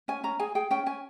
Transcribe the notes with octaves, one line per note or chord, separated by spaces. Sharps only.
C#4 G#5
C#4 A#5
G#4 G#5
G#4 G5
C#4 G5
C#4 G#5